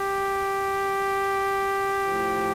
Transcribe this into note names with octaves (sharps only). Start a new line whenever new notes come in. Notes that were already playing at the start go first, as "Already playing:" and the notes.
Already playing: G4
A2 F3